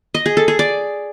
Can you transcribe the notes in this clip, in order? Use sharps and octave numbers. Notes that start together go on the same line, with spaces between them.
D#5
G#4
A4
G#4
D5